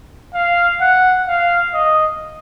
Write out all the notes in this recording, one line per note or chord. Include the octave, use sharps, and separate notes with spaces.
F5
F#5
F5
D#5